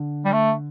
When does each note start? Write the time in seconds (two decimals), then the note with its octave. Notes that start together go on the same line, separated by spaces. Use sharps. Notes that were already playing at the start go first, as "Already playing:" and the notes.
Already playing: D3
0.25 G3
0.32 A3